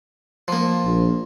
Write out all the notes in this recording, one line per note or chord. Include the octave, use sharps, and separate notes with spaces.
F3 A#3
A#1